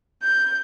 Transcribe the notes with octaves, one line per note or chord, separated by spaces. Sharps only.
G6